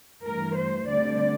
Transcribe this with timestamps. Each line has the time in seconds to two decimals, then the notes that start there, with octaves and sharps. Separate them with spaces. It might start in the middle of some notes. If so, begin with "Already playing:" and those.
0.24 G2 E3 A3 A#4
0.57 C5
0.88 D2 D3 G3 C4 D5